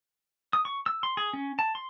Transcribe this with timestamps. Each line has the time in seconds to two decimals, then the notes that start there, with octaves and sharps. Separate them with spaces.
0.53 D#6
0.65 C#6
0.86 E6
1.03 C6
1.17 G#4
1.33 C#4
1.59 A5
1.75 C6